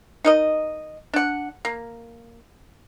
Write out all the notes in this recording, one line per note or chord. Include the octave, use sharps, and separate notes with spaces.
D#4 A#4 D#5
D4 F#5
A#3